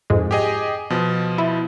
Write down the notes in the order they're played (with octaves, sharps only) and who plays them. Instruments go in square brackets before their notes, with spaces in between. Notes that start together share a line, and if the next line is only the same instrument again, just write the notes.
[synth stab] F2 G#2 G#3
[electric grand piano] G4 G#4 D#5
B2 F3
[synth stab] E4